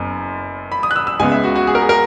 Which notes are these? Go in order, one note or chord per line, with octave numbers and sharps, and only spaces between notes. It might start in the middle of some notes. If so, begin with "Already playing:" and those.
Already playing: F#1 F#2 B3
B5
D#6
F#6
E6
E6
C#2 C#3 G#3 B3 G#5
E5
F#4
F#4
G#4
A#4
G#4
A#4